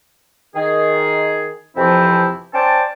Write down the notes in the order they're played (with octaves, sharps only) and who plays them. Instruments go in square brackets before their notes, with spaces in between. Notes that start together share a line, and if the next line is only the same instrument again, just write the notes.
[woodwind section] D#3 G#4
F2 C3 E3 F3 C4 E4
C#4 C5 D5 G5 A5